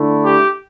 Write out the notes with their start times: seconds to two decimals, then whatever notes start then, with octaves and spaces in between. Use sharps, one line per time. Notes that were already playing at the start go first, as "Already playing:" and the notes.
Already playing: D3 A3 E4
0.25 G4